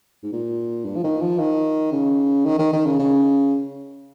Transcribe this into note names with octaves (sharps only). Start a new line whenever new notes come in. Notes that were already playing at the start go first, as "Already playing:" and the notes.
G#2
A#2
G2
F3
D#3
F3
D#3
C#3
D#3
D#3
D#3
C#3
C#3